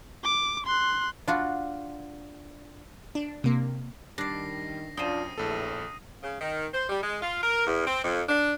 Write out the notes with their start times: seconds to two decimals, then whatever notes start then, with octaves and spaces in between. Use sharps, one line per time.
0.24 D6
0.66 C6 F#6
1.27 D4 F4 F#4
3.15 D4
3.44 C3 A#3
4.18 D#3 G3 D4 D5 A#6 C7
4.97 F#2 D4 F4 C5 G5 D#6 D#7
5.38 A#1 E2 A2 A4
6.22 C#3
6.40 D#3
6.72 C5
6.89 G3
7.02 G#3
7.22 F4
7.41 A#4
7.66 E2
7.86 C4
8.03 F2
8.28 D4